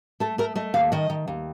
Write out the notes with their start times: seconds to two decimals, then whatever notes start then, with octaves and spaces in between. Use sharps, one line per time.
0.20 A3 A4
0.38 A3 A#4
0.55 A3 D#5
0.74 D#2 F5
0.92 D#3 D#5
1.10 D#3
1.28 D#2